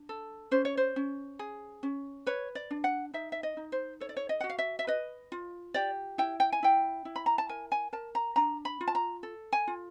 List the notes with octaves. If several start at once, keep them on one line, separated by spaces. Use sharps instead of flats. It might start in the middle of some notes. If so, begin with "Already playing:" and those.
Already playing: D4
A4
C#4 C5
C#5
C5
C#4
G#4
C#4
B4 C#5
D5
D4
F#5
D#4 E5
E5
D#5
D#4
C5
A4 C#5
D5
C#5
D#5
F#4 F#5
F5
E5
E5
B4 D#5
F4
G4 D5
E4 G5
G5
G#5
E4 G5
E4
B5
A#5
A5
A#4 G#5
G#5
A#4 A5
A#5
D4 A#5
B5
F4
A5
A#5
A4
G#5
F4